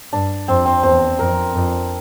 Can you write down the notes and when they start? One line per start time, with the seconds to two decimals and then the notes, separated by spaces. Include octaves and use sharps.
0.13 G2 D4
0.48 F2 C4
0.66 C4
0.83 E2 C4
1.19 F2 A#4
1.54 F2